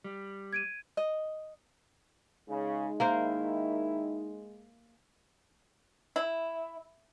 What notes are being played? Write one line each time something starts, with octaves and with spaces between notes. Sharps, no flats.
G3
G#6 D7 D#7
D#5
C#3 G#3 D#4
D#3 A#3 E4 A#4 C5
E4